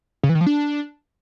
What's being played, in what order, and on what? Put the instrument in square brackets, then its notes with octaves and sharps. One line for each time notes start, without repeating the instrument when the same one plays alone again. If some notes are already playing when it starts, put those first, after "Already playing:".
[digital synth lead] C#3
E3
D#3
F3
D4